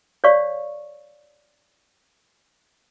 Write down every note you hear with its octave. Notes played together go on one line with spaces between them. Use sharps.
C#5 D5 F5 C#6